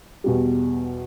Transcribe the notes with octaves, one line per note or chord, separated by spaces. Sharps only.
E2 B2 G3